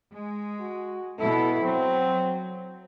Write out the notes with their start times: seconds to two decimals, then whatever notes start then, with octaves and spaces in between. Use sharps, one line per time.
0.13 G#3
0.60 F#4
1.19 B2 E4 A4
1.63 F#3 C4